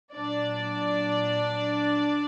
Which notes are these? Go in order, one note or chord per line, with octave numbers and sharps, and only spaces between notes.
A#2 F#3 D4 D5